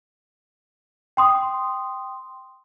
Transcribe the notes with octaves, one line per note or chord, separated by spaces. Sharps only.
G5 C6 D#6